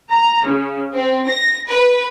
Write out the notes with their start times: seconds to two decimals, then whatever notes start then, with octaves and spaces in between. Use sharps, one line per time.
0.12 A#5
0.45 C#3
0.93 C4
1.26 A#6
1.67 B4